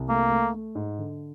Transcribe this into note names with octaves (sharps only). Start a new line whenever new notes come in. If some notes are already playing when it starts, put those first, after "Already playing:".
Already playing: C2
A3 A#3
A3
A3
G#2
D3